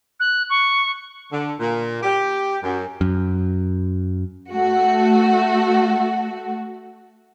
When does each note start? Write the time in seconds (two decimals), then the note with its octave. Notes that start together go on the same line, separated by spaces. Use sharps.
0.20 F#6
0.50 C#6
1.32 D3
1.60 A#2
2.03 G4
2.63 F#2
3.01 F#2
4.53 A3 F#4